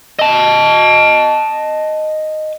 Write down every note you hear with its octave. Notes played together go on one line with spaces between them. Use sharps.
D#5 A5